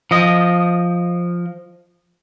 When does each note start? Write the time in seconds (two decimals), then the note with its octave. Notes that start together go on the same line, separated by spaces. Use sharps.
0.11 F3 D#5